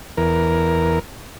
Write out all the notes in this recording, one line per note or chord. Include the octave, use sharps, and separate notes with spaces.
E2 A#4